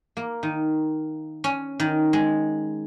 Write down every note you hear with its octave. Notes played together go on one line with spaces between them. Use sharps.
A#3
D#3
C#4
D#3
G#3